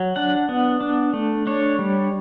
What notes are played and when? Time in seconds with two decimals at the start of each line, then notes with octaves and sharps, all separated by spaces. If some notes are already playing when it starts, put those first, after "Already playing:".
Already playing: F#3
0.16 D4 F#5
0.49 B3
0.80 D4
1.13 A3
1.47 D4 C#5
1.79 G3